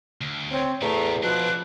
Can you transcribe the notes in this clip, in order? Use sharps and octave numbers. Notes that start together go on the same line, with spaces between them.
D2
C4 C#5
E2 A2 A3 B3 A#5
B2 F3 D4 E4 F#6